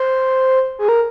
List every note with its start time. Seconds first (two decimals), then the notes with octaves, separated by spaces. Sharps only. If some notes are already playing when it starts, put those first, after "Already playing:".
Already playing: C5
0.79 G#4
0.89 A#4